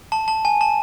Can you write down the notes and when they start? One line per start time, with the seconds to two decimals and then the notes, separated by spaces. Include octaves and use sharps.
0.12 A5
0.28 A5
0.45 G#5
0.61 A5